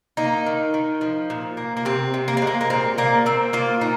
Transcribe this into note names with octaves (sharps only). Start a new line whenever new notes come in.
A#3 D#4
D#3
D#3
F3
A#2
A#3
A#3
C3 C4
C3
A#3
C4
G#3
A#3
A#3
A#2 C4
A#2 A#3
A#3 C4
A#3 F4
A#2 D#4